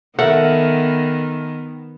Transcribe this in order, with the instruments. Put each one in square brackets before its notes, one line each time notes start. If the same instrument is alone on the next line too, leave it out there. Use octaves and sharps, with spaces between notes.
[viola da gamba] D#3 B3 [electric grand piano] A4 A#4 E5 [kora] F#5